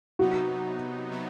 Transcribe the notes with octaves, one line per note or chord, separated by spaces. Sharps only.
C3 F#3 B3 D#4 F#4
C3 F#3 B3